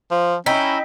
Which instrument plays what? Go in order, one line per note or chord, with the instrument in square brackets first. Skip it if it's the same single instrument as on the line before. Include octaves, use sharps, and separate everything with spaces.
[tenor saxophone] F3
[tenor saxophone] C#4 [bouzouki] D#4 E4 [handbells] D#5 G5 B6